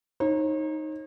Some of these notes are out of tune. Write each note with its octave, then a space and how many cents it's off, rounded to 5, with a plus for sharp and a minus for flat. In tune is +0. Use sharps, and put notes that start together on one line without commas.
D#4 +0 C#5 -45